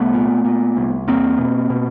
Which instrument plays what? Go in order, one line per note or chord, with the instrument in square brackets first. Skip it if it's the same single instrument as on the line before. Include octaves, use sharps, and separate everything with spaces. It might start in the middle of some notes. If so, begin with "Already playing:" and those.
Already playing: [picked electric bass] C2 A3 B3
A#2
A#2
C2
E2 A#3 C4
B2
B2